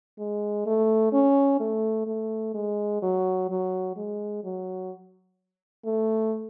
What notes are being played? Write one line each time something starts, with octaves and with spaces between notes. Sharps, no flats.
G#3
A3
C#4
A3
A3
G#3
F#3
F#3
G#3
F#3
A3